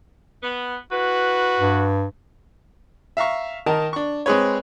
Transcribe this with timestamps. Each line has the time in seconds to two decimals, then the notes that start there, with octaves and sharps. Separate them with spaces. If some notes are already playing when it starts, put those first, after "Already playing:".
0.43 B3
0.92 E4 F#4 B4
1.60 G2
3.17 E5 F5 A#5 C#6
3.66 D#3 A#4 D#5 A5
3.93 D4 C#6
4.26 G#3 C4 G#4 B4 C#5